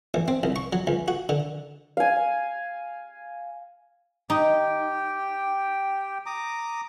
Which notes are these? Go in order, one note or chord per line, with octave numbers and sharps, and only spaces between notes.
A1
C4
C2
C#6
F#3
C#2
F#4
D3
F5 G#5
D#4 G4 G5
A#5 D6 D#6